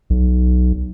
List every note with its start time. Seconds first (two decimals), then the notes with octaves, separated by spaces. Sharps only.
0.10 B1